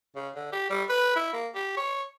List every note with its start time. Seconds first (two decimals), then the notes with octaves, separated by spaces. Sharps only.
0.15 C#3
0.35 D3
0.52 G4
0.70 G3
0.89 B4
1.16 E4
1.33 A#3
1.54 G4
1.77 C#5